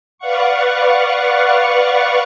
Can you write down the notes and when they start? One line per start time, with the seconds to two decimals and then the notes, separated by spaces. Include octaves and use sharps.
0.18 B4 D5 F5 F#5 C#6